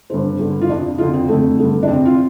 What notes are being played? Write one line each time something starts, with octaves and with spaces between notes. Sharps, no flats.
G2 D3 C5
G2 D3
F4
F2 C3 D4
F2 D3 F4
C4
F2 D3 A3
G2 D3
D4
F2 C3 C4
F4